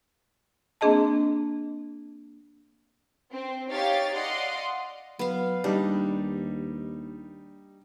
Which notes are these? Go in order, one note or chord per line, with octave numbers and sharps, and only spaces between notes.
A#3 C4 D4 G#4 D#5 A5
C4
D#4 G4 C#5 F5 A6
D5 D#5 F5 F#5 C6
F#3 B3 F5
D#2 G3 D4 D#4